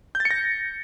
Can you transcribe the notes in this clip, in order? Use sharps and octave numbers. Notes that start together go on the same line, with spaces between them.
G6
A6
C#7
A#6